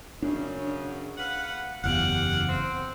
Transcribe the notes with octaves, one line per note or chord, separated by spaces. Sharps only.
F#2 C#3 D4
B4 F5 F#5
F#1 E2 G4 F5 F#5
C4